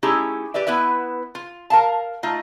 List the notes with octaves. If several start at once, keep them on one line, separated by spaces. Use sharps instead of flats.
A3 C#4 D#4 E4 G4 G#4
G4 B4 D5 E5
B3 E4 B4 E5
F4
A#4 F5 A5
A3 D#4 F4